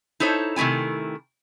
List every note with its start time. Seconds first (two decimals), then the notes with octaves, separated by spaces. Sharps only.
0.20 D#4 E4 A4 C5 C#5
0.56 C3 D#3 A3 E4 G#5